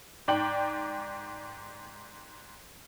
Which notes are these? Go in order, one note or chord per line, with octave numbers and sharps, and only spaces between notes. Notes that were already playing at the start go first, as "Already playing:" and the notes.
G#2 D5 G5 F#7